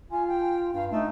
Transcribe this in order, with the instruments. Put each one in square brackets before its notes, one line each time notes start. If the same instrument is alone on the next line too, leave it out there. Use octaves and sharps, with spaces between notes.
[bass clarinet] F4 [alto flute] G#5
[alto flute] G5
[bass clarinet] G2 [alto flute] F5
[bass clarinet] A3 [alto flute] D#4